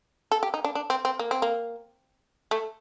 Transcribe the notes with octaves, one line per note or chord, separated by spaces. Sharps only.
A4
G4
D#4
D4
D4
C4
C4
A#3
C4
A#3
A3